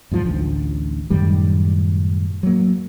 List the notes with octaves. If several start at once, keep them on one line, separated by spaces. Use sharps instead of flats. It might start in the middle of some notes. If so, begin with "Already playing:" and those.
E2 G#2 F3
A1 D2
F#2 A2 D#3 G3
F#3 A#3